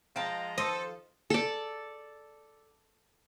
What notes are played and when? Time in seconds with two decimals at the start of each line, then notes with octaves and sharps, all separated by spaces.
0.16 F3 G#3 D#5 G5 A5 A#5
0.58 A4 C5 D#5
1.30 A4 D5